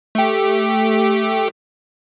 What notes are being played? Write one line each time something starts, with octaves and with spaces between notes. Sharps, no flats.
A3 G4